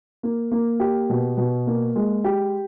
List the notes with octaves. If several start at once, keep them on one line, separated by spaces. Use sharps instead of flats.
A#3
A#3
G4
B2
B2
A#3
G#3
G4